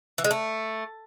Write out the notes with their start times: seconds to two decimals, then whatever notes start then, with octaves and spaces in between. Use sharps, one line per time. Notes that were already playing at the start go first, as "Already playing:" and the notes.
0.18 E3
0.24 G#3
0.31 A3